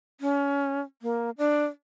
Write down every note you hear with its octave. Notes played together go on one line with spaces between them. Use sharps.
C#4
A#3
D4